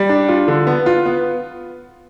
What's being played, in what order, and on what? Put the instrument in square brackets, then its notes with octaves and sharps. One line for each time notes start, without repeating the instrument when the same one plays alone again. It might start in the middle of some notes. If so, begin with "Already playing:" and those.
Already playing: [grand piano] G3
D4
F4
D3
B3
F4
B3